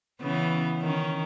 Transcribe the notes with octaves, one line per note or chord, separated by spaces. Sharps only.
C#3 E3 B3
D#3 C#4